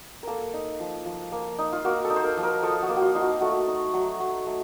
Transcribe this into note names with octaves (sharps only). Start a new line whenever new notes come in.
A#3 A4 A#4
D#4
F3
F3
A#3
D#4
F4
A#3 F#4
A4
D#4
C5
A#4
F3
A#4
F3 A4
F#4
A#3
F#4
F4
D#4 F4
F#4
A3 F#4
D#4
F#3
F#3
A3